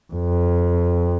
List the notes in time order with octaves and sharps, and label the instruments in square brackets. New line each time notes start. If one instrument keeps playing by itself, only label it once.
[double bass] F2